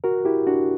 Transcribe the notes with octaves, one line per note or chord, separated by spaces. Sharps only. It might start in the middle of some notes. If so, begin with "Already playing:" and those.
F#4 A#4
E4 G4
D4 F#4